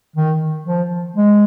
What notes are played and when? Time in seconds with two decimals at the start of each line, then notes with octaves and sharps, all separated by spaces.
0.16 D#3
0.66 F3
1.17 G#3